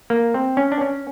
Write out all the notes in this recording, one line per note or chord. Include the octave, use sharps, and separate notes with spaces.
A#3
C4
C#4
D4
C#4